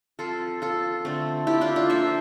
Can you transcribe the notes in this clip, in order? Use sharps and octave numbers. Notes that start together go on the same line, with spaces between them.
F3 C4 F4 A4
F4 A4
D3 A3 C4
E4 G4
D4 F4
D4 F4
F3 A#3 C5 E5